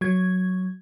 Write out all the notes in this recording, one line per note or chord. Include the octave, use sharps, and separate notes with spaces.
F#3 G#6